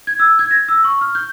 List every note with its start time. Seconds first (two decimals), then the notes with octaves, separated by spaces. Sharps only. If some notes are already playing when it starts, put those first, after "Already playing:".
0.07 G#6
0.19 E6
0.39 G#6
0.51 A#6
0.68 E6
0.84 C#6
1.01 F6
1.15 G6